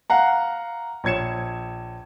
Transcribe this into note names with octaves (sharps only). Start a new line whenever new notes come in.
F5 F#5 A#5
A#1 C#5 G#6 C#7 E7